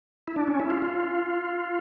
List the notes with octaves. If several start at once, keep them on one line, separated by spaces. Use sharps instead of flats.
E4
D4
C#4
E4
F4
F4